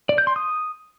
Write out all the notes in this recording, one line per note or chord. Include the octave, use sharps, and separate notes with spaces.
D5
G6
C6
D#6